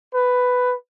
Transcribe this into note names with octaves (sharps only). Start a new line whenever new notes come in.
B4